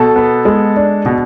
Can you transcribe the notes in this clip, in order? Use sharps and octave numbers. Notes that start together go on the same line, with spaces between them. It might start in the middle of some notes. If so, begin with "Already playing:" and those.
Already playing: B2 A4
B3
G#3
D4
B2